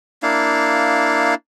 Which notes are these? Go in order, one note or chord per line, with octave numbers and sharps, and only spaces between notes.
A#3 D4 E4 F5